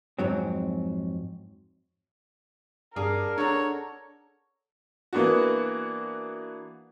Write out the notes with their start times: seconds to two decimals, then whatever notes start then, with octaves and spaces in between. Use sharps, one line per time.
0.19 F2 G#2 F#3 C4
2.96 G2 D4 G#4 A#4 F5
3.38 D4 A4 C#5 F#5 A#5
5.13 E3 A#3 B3 D4 F#4